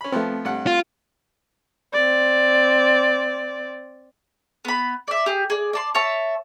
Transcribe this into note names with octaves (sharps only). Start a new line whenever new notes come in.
C#4 B5
F3 A3 B3 C4
G2 F#5
F4
C4 D5
B3 B5
D5 E5
G4 G#4
G#4 D5
D5 A5 C6
C#5 E5 A5